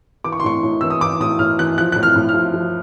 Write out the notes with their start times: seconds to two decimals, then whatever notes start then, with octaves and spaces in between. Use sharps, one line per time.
0.24 E3 D6
0.32 C#6
0.40 C6
0.44 A2 C#6
0.63 A2
0.81 E3 E6
0.90 D#6
1.01 E3 D6
1.20 A2 D#6
1.39 A2 F6
1.59 E3 F#6
1.78 F3 F#6
1.92 A2 F#6
2.03 F6
2.16 A2
2.29 F6
2.34 F3
2.54 F3